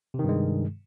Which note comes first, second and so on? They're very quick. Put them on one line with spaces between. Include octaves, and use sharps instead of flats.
C3 D#3 G2 G#3